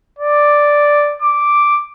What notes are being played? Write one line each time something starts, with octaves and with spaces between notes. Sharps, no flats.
D5
D6